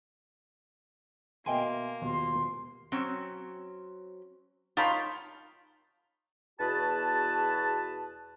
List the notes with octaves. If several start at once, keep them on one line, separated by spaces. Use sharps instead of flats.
B2 A#3 D#5 E5 G5 G#5 C6
D#1 B2 C6
F#3 C4 C#4
D#4 F4 C#5 G5 A5 B5
E2 B2 F#4 G#4 B4 A5